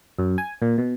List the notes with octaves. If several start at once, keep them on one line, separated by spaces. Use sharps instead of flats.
F#2
G#5
A#2
B2